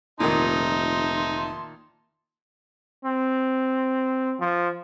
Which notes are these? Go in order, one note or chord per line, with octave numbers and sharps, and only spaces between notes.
F1 A#2 D#3 D#4 E5 A5 C6
C4
F3